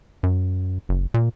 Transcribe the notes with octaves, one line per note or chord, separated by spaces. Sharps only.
F#2
F#1
A#2